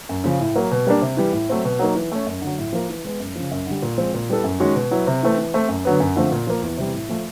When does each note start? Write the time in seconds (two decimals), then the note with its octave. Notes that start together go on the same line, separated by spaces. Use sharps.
0.09 F#2
0.24 C#3 F3
0.40 A2
0.55 F#3 A#3
0.71 B2
0.86 G3 A#3 D4
1.01 C3
1.17 E3 G3
1.33 A2
1.49 F#3 A3 C4
1.65 B2
1.79 F#3 A#3 D#4
1.95 E3
2.12 A3 C#4
2.27 F#2
2.42 D3 F#3
2.58 A2
2.73 F3 A#3
2.89 E3
3.04 G#3 B3
3.20 F#2
3.35 C#3 F3
3.51 F#2
3.66 D3 G3
3.82 A#2
3.98 F3 G#3 C4
4.14 A#2
4.29 G3 B3 E4 A4
4.44 F#2
4.60 D#3 G#3 C#4 F#4
4.75 B2
4.91 F#3 B3 E4
5.07 C3
5.23 E3 A3 C4
5.38 E3
5.54 A3 C4
5.68 F#2
5.85 D3 F#3 B3
6.00 F#2
6.16 D3 F3 A3 C4
6.32 A#2
6.47 F3 A#3
6.62 E2
6.77 C3 E3 G3
6.94 A2
7.09 F3 A3